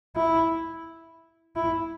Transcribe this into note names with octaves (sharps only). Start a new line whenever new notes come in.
E4
E4